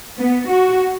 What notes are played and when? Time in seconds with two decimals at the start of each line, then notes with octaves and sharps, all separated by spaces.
0.18 B3
0.48 F#4